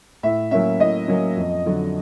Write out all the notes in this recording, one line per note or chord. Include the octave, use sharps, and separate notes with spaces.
A2 E5
F#3 A#3 C#4 E5
A2 D#5
F#3 A#3 C#4
F2
D3 F#3